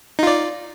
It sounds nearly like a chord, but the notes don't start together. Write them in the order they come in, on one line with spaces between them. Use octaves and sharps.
D#4 F4 D5